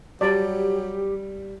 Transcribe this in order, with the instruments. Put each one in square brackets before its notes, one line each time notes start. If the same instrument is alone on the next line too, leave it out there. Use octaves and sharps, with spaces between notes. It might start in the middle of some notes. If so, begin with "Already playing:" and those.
[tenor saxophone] F#3 [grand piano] G3 [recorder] G4 [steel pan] D5